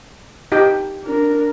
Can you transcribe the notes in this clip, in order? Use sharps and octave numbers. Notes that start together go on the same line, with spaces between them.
D#4 G4 G5
D4 A#4